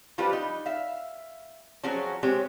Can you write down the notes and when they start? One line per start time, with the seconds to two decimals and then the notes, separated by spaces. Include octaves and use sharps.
0.18 F3 G3 F4 G4 B4
0.33 D#4
0.66 E5 F5
1.83 F3 F#3 C#4 F#4 G#4
2.23 G#3 C4 G4 C#5